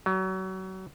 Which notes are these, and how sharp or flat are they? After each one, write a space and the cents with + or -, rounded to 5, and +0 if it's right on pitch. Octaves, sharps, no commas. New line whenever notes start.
F#3 +30